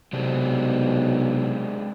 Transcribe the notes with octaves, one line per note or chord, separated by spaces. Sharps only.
B1 C3 G#3 C4 D4